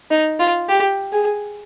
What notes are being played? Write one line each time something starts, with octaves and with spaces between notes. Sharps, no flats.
D#4
F4
G4
G#4